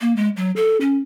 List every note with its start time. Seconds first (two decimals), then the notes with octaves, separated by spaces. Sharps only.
0.01 A#3
0.16 G#3
0.37 F#3
0.56 A4
0.81 C#4